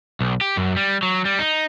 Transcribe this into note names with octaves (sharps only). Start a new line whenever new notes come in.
B1
G4
F#2
G3
F#3
G3
D#4